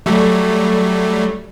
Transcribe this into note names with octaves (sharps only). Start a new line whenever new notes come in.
F#3 G3 A3